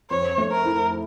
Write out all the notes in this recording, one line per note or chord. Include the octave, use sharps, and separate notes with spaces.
F2 C#5
A3
A#4
E4